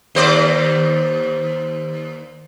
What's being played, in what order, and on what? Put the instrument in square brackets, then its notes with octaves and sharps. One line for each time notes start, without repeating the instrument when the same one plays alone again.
[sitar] D#2 C5 D5